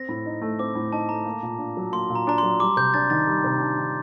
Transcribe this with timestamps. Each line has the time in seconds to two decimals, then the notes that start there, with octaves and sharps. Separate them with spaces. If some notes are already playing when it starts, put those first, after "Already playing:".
Already playing: C4 A#6
0.09 A2
0.26 D#4
0.41 A3
0.59 C4 D6
0.75 A2
0.92 D#4 A5
1.09 A3 A#5
1.25 A#3
1.43 A#2
1.59 D4
1.77 F#3
1.92 A#3 C6
2.09 A#2
2.15 A#5
2.27 D4 A#5
2.38 F#3 C6
2.60 G3 D6
2.77 C3 G6
2.94 D4 A6
3.10 D#3 A6
3.27 G3
3.44 C3
3.60 D4
3.78 D#3